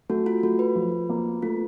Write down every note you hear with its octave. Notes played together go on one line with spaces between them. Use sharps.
A3 F#4
F4
A3 F#4
B4
F3
A#3
A3 F4